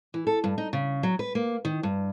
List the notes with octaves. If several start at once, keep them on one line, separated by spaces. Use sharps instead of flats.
E3
A4
G2
D#4
C#3
F#3
B4
A#3
D#3
G2